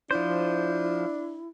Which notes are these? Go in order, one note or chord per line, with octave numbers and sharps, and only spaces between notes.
F3 D4 E4 C5